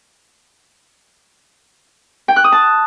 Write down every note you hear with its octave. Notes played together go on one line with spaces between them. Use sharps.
G5
F#6
D#6
A5